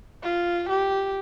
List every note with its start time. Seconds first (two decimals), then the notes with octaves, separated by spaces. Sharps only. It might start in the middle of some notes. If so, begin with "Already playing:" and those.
0.23 F4
0.70 G4